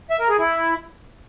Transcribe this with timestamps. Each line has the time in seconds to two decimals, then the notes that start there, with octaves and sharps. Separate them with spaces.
0.10 E5
0.20 A#4
0.29 G#4
0.39 E4